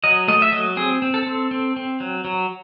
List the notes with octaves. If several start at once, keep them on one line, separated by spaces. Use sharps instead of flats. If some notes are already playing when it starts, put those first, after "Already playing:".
F#3 D#5
A3 D#5
E5
F#3 D#5
C4 G#4
C4
A4
C4
C4
C4
F#3
F#3